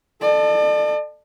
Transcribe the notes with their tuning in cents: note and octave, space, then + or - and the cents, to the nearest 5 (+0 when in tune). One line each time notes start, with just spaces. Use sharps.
A4 +0 D5 +40